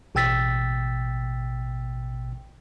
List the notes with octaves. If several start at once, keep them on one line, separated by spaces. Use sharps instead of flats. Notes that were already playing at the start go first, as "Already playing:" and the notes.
A1 B2 G5 E6 A6 B6